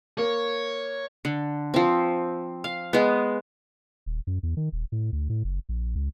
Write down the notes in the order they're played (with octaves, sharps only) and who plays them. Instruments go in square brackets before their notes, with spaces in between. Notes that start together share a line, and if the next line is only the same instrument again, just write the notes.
[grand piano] A#3 [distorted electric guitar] C#5
[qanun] D3
F3 C4
F5
G#3 B3
[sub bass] D#1
F#2
E2
D#3
D#1
A2
D2
A2
F#1
A#1
C#2